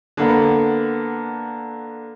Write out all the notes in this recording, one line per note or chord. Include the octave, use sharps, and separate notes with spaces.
D3 A#3 B3